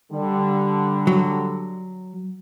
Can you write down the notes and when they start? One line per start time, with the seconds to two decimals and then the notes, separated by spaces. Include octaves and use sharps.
0.13 D3 G3
1.07 F#3